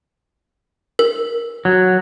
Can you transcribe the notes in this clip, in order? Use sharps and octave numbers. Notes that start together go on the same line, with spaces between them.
A#4
F#3